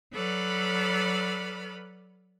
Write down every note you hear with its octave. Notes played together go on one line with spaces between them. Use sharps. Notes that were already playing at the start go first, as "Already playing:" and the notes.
F#3 A4 B4 D5 B5 F6